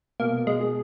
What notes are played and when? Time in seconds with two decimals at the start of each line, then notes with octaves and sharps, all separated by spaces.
0.20 B2 A#3
0.47 G#3
0.60 G#4